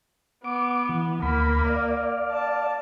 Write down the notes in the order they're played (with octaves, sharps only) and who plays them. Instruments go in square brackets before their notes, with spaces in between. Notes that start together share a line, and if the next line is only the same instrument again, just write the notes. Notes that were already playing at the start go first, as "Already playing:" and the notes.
[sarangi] B3 [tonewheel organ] D6
[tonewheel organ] E3
[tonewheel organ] D2 B5 [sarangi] A#3
[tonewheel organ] D5 F5
[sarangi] A5